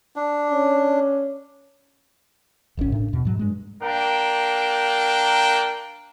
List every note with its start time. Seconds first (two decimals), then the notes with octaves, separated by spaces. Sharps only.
0.16 D4
0.50 C#4
2.77 D1 G#1 C#2 C#4
2.92 A2 D4
3.13 E2 B2
3.25 G#2 F#3
3.39 G2 G#3
3.83 A#3 D4 A#4 G5